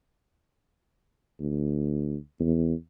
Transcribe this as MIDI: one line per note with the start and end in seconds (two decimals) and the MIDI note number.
1.40 2.16 38
2.40 2.73 40